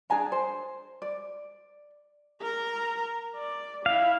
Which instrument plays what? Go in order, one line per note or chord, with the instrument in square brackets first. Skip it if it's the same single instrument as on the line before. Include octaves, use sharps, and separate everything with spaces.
[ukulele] D4 G#4 G#5 A#5
C5
D5
[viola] A#4 A#5
D5
[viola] E4 [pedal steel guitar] F5